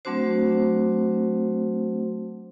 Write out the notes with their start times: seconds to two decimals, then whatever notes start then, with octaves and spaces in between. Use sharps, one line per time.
0.05 F#3 A3 C4 D4 F#4 C5